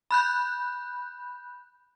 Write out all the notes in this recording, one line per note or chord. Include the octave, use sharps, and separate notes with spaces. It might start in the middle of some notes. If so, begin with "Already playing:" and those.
B5 F#6 G6